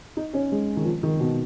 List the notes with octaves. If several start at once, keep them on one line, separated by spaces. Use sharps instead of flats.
D#4
C#4
G#3
D#3
F3
D#3
B2